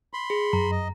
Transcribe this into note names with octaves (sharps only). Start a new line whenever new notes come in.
B5 C6
G#4
F#2 A#5
D#5